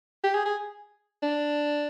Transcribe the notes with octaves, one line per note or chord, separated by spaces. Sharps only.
G4
G#4
G#4
D4